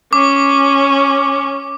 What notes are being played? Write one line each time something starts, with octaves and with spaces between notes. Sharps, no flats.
C#4 D6